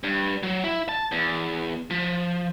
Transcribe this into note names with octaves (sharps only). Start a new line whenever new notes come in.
G2
F#3
E4
A5
E2
F3